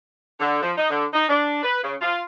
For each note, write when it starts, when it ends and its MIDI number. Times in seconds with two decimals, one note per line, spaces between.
0.40 0.61 50
0.62 0.72 53
0.78 0.88 63
0.90 1.06 50
1.14 1.28 63
1.29 1.63 62
1.63 1.83 71
1.83 1.94 49
2.02 2.21 65